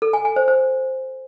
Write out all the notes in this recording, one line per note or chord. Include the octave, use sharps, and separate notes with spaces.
A4
G#5
G#5
C5
C5